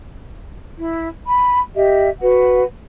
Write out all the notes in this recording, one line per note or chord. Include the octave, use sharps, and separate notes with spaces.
E4
B5
G4 D#5 E5
F#4 B4 F#5